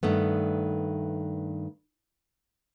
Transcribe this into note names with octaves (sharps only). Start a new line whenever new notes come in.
G2 D#3 A3 B3